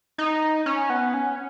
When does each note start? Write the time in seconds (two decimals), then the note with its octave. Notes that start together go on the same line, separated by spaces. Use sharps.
0.18 D#4
0.66 C#4
0.90 B3
1.14 C#4